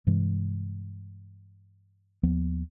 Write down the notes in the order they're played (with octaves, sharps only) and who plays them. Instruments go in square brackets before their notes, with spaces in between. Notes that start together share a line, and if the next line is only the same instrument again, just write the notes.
[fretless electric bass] G2 C3 E3 G#3
D#2 F3 B3